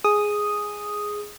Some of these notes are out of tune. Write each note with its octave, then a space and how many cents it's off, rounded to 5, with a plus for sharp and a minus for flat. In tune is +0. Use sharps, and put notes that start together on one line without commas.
G#4 +0 D#6 +0